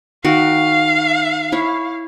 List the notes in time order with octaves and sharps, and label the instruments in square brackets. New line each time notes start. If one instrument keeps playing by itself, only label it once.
[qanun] D#3 F#4 [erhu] F5
[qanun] E4 C#5